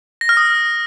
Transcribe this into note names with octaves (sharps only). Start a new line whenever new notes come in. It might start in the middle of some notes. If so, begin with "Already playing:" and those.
A#6
F6
D#6